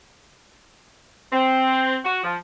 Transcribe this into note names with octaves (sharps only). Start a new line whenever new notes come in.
C4
F#4
F3